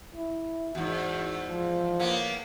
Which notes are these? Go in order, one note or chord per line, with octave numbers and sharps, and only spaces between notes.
E4
E2 G#2 F#4
F3
A2 A#3 B3